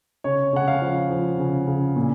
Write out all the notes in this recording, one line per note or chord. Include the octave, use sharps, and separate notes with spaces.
C#3 C#5
C#3 F#5
F5
F3
F3
C#3
C#3
A#2